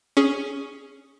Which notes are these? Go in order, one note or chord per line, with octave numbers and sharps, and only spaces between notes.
C#4 G#4